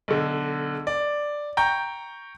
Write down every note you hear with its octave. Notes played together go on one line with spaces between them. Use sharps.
B1 D3
D5
G5 A#5 C#6 G6